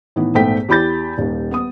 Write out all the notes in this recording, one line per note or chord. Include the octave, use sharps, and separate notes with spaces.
A2 D#3 E3 B3
A#1 G#2 A3 B3 G5 B6
E2 G4 B5 G6 A6
D#1 D#2
B3 D#6